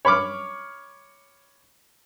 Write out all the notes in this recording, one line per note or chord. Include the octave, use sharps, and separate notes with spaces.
C#5 B5 C#6 D6 F6